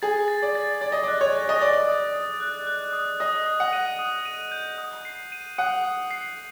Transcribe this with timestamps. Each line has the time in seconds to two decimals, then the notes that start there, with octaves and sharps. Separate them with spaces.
0.02 G#4 A6
0.28 A6
0.42 D5
0.55 A6
0.81 D5 A6
0.92 D#5
1.03 D5 F#6
1.21 C#5
1.35 A6
1.49 D#5
1.61 D5 A6
1.88 D#6
2.14 D#6
2.40 F#6
2.67 F#6
2.93 D#6
3.20 D#5 D#6
3.46 D#6
3.60 F#5
3.73 D#7
3.99 D#6
4.25 D#7
4.51 G6
4.78 D#6
5.05 C7
5.32 D#7
5.58 F#5 D#6
5.84 D#6
6.11 C7